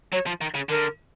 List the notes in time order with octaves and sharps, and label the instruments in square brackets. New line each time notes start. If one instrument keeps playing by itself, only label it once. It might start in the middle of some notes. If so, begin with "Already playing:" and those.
[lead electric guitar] F#3 [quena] C#5
[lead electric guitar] F3
D#3
C#3
[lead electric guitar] D3 [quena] A#4